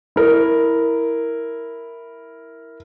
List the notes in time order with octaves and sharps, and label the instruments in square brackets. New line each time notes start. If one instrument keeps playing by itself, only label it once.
[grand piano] E4 A#4